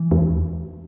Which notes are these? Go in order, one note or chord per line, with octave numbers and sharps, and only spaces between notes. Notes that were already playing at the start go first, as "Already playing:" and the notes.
Already playing: E3
E2